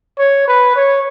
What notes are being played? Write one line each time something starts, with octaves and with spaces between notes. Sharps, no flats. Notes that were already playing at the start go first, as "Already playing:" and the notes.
C#5
B4
C#5